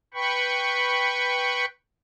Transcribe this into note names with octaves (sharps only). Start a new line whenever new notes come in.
B4 G5 B5 C#6